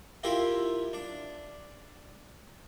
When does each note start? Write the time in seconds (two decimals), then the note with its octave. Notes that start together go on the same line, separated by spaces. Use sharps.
0.23 E4 F4 G4 A#4
0.93 D4